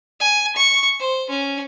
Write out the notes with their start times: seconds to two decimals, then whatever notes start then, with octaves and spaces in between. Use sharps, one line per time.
0.20 G#5
0.56 C#6
1.00 C5
1.30 C#4